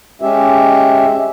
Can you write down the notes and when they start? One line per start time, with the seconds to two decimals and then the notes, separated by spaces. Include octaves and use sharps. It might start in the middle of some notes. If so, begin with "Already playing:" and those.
0.22 G#3 C#4 G4 E5